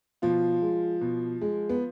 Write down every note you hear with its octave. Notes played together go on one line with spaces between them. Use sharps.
B2 F3 F4
G#3
B2
G#3
B3